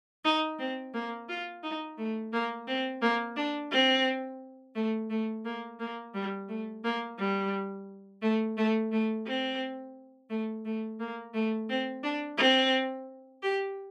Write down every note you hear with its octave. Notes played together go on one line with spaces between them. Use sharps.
D#4
C4
A#3
F4
D#4
A3
A#3
C4
A#3
D4
C4
A3
A3
A#3
A#3
G3
A3
A#3
G3
A3
A3
A3
C4
A3
A3
A#3
A3
C4
D4
C4
G4